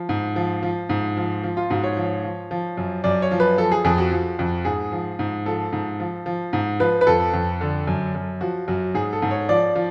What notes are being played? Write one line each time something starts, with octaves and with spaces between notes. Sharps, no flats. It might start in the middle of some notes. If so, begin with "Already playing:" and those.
Already playing: F3
G#2
F3
F3
G#2
F3
F3
F4
G#2 F#4
C#5
F3
F3
F3
F#2
F#2 D5
C#5
F3
B4
F3 A4
G#4
F2 G#4
F#4
F3
F2
G#2 G#4
F3
G#2
F3 A4
G#2
F3
F3
G#2
F3 B4
B4
F2 A4
F2
D3
F#2
F#2
F3 F#4
F#2 F#4
G#2 G#4
A4
G#2
C#5
F3 D5
F3